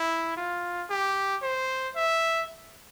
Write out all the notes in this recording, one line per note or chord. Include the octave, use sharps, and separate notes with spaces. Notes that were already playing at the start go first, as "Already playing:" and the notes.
Already playing: E4
F4
G4
C5
E5